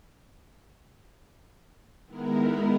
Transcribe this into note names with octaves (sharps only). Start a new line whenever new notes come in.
D#3 G#3 B3 E4 A#4